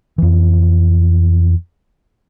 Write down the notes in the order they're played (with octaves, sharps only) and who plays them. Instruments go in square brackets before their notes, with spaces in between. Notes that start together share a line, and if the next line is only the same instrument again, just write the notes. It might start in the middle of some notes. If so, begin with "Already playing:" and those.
[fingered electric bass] F2 E3